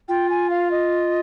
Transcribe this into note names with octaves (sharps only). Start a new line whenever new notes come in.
F4 G5
G#5
F5
D#5